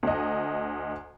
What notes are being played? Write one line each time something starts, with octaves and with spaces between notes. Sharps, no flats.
D2 D#5